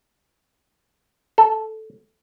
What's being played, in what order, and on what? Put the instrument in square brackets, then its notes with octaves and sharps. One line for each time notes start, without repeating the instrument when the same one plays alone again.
[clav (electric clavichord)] A4